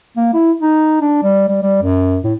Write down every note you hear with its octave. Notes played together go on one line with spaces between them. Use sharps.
A#3
E4
D#4
D4
G3
G3
G3
F#2
A2